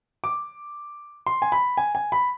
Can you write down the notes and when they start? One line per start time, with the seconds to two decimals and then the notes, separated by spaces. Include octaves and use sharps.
0.24 D6
1.26 C6
1.42 G#5
1.52 B5
1.77 G#5
1.95 G#5
2.12 B5